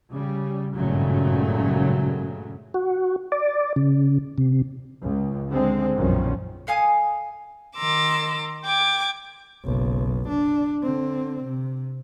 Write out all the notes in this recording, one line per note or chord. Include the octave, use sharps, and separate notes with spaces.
C#3 G3
G#1 G2 A#2 C#3 F#3 A3
F#4
D5
C#3
C3
C#2
D3 G#3 C4
B1 F#2 A#2 D#3 F3 C#4
A4 F5 G#5 D#6
D#3 A#5 C6 D6 E6
G5 D6 G#6
F#1 B1
D4
D3 C4
C3